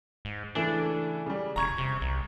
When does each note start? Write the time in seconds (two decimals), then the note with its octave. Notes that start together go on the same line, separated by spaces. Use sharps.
0.25 G#2
0.55 C#3 E3 A3 D4
1.26 C#3 G3
1.56 E1 A#5 C#6 G#6
1.78 C3
2.01 C2